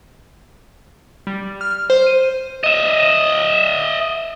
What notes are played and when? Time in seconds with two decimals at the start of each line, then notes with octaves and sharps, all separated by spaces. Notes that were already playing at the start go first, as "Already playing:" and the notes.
1.27 G3
1.61 F6
1.90 C5
2.06 D#7
2.64 D#5 E5